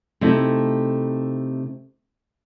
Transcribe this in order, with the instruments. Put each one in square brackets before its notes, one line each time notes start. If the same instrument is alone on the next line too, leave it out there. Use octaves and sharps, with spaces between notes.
[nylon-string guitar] C3 A3 D#4 E4 A4